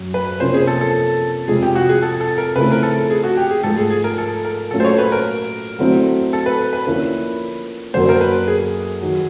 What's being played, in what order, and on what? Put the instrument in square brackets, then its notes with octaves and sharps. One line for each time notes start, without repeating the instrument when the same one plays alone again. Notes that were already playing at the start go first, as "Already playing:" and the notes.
Already playing: [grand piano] F#2 F#3
[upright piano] B4
[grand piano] C3 F3 A#3 C#4 [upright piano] C5
[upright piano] G#4
A4
A4
[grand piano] F2 C3 F3 G#3 [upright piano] G#4
[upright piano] G4
F#4
G#4
A4
A4
A#4
[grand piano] C#3 F3 A3 C4 E4 [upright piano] B4
[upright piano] A#4
A4
G#4
F#4
G4
G#4
[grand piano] G#2 F3 A3 [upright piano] A4
[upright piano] G#4
G#4
A#4
A4
A#4
[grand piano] A#2 F#3 A3 C#4 F4 [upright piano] A4
[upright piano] C5
C#5
B4
A#4
[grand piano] D3 F#3 A3 C4 E4
[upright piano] A4
B4
B4
[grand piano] D3 F3 A#3 C#4 E4
[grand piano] F#2 D3 F#3 A#3 [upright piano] C5
[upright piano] A#4
B4
G#4
[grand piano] D#3 F#3